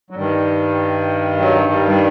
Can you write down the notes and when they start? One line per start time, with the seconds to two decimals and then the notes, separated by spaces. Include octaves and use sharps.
0.10 F#3
0.15 G2 D#3 G3
1.40 F#3
1.71 G3
1.88 G3